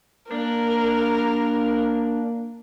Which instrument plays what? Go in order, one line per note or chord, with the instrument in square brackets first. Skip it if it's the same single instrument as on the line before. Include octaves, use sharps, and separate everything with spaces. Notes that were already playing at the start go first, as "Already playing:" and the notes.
[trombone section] A#3 [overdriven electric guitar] D4 [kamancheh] A#4